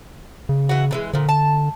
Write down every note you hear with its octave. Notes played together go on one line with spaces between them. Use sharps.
C#3
E3 F#4
D3 E3 G#3
A#2 D3 F3
A5